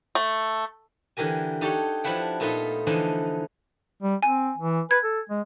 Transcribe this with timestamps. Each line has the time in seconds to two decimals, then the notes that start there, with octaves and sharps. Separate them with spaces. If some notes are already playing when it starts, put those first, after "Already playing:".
0.15 A3
1.17 D3 E3 G4 A#4 G#5
1.61 D#4 G4 A4 C#5 D5 F#5
2.04 F3 D4 E4 B4 F#5 G5
2.40 A#2 A3 B3 D#4 F4
2.87 D3 E3 F3 D4 D#4
4.03 G3
4.23 C4 G#5
4.57 E3
4.91 B4 G#6
5.04 A4
5.29 G#3